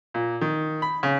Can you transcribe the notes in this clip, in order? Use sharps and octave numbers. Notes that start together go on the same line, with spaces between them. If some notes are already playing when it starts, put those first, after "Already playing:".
A#2
D#3
B5
C#3